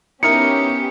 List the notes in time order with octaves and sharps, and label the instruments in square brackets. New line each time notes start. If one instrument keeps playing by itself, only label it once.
[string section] B3 C#4 G4 [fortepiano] D#4 E4 A#4 [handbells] C#7